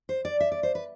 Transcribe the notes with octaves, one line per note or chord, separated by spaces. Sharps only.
C5
D5
E5
D5
C5
B4